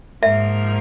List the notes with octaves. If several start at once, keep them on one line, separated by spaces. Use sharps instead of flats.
G#2 F3 A#3 E5